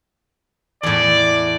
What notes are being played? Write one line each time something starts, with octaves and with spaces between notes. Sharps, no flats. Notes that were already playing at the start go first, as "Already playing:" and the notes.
E2 A2 D5